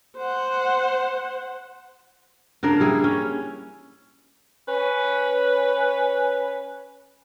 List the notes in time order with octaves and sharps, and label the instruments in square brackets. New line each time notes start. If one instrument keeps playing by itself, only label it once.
[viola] C5 F#5
[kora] C#3 A#3 D4 A#4
G3 E4 G#4
C#4
[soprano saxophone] C#4 [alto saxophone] B4